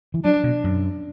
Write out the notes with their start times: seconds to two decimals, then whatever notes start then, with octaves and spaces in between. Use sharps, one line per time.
0.14 E3
0.24 F#3 D4
0.44 B2
0.64 F#2